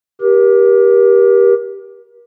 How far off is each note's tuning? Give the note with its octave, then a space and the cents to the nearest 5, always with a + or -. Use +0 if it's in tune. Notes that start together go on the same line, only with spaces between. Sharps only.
G4 +0 A#4 +35